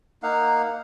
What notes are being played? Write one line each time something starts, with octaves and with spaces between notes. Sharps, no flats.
A#3 D#4 F5 F#5